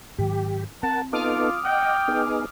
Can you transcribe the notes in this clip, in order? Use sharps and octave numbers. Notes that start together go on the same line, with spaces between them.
G#2 D#3 F#3 G4
C4 A#4 F#5 A5
B3 D#4 F4 A4 D6 D#6 F6
D#5 F#5 G5
B3 D#4 G#4